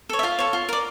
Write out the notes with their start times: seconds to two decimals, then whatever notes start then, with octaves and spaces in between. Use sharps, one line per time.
0.09 A4 C#5
0.19 E5
0.23 F4 F5
0.39 A4 C#5
0.53 F4
0.69 A#4 D5